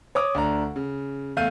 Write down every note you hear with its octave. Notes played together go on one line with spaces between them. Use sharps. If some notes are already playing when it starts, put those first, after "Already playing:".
C#5 D6 D#6
D2 D4 A#5
C#3
E2 A3 F5 G6 D#7